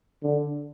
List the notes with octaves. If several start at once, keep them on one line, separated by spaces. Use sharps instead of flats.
D3